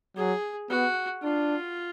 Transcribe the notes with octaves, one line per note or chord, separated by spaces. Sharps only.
F#3 G#4
B3 F#4
D4 F4